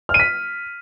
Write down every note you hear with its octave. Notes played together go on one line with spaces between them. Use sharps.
F6
D#7
B6